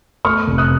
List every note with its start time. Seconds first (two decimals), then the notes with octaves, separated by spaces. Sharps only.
0.25 A3 C#6 F6
0.47 F1
0.58 D#6 F#6